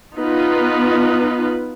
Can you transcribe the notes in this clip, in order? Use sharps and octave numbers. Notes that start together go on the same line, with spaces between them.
B3 D#4 F4 B4